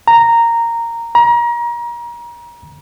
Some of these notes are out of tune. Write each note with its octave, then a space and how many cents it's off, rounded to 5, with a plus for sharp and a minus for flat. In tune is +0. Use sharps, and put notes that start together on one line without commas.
A#5 -10
A#5 +30